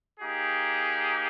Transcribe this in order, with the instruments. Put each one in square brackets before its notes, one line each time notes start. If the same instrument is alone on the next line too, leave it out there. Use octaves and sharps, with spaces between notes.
[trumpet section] A#3 D#4 G4 G#4